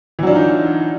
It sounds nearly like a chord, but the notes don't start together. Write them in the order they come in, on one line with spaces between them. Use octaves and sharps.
E3 F#3 D4 F4 D#4